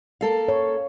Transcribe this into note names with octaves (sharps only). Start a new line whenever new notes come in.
A#3 A4 F5
C#5